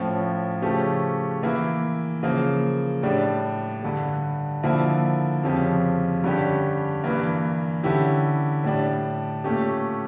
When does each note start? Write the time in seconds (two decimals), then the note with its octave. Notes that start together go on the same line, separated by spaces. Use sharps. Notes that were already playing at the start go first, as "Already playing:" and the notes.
Already playing: A2 F3 C#4
0.62 C#3 F3 A3 C#4 G4
1.43 E3 A#3 E4
2.23 C#3 F3 A#3
3.03 A2 G3 D4
3.83 G2 D3 G3
4.63 D3 F3 A#3 E4
5.44 F2 C#3 F3 C#4 G4
6.24 G2 D3 G3 C#4 G4
7.04 G2 E3 A#3
7.83 D3 G3 C#4 E4 G4
8.64 A2 G3 D4
9.44 A#2 A3 C#4 G4